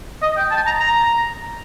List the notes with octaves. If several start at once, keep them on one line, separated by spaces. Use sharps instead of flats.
D#5
G5
A5
A#5
A#5